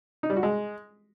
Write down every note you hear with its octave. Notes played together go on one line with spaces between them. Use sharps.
D#4
G3
F#4
G#3